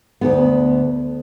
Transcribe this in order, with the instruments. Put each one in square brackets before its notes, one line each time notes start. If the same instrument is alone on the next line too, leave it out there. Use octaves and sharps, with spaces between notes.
[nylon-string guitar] D2 G#2 B3